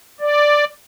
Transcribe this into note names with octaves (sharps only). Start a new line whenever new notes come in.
D5